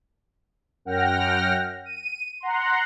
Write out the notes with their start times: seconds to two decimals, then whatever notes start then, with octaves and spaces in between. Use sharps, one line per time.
0.85 F#2 F#5 G5 F6 A#6
1.86 D#7
2.40 F#5 A#5 C6